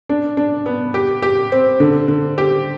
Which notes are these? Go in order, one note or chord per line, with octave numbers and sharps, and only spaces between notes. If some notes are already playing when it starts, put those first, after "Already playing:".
D4
D4
B3
G4
G4
C4
D3
D3
G4